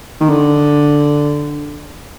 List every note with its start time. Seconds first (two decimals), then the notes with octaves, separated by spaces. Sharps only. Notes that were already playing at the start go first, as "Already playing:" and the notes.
0.20 D#3
0.29 D3